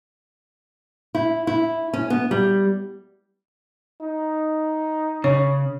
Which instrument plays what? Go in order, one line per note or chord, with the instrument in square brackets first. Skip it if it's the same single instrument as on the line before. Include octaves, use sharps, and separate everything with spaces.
[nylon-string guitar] E4
E4
C#4
B3
G3
[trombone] D#4
[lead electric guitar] C#3 [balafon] C#5